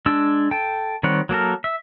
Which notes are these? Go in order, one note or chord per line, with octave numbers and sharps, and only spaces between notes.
G#3 D4 E6
A4 G5
D#3 G3 C4 C#5 F#5
F#3 A#3 A4 A#4
E5